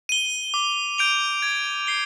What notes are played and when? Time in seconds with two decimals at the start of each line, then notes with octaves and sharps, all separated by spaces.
0.09 D#7 G7
0.54 D6
0.98 G6 D7 F7
1.42 G#6
1.87 C7 G7